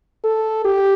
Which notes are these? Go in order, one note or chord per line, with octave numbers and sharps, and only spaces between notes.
A4
G4